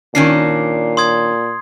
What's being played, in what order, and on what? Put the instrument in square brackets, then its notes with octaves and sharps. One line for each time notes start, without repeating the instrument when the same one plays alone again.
[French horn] A#2 [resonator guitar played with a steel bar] D#3 C#4 D4 [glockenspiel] C7
[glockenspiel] C6 D#6 G#6